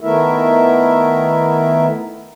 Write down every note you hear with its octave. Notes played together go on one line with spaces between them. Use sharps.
D#3 A3 B3 E4 A#4 E5